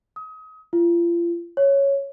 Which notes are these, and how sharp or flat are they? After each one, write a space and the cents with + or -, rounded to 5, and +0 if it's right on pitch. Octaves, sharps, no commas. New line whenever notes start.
D#6 +30
F4 -35
C#5 +0